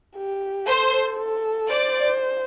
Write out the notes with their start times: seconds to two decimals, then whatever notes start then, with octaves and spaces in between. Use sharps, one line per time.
0.16 G4
0.66 A4 C5
1.18 A4
1.70 C5 D5